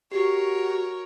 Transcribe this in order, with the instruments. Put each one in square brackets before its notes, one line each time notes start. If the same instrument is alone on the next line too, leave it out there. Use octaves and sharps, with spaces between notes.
[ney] F#4 [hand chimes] G4 [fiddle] A#4 C#5